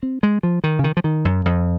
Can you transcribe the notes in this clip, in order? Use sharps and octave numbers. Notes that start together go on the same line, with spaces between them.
C4
G#3
F3
D#3
C#3
D#3
F3
D#3
F#2
F2